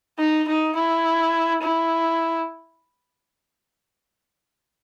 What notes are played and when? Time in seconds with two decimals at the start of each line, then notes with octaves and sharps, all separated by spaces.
0.18 D#4
0.48 D#4
0.75 E4
1.61 E4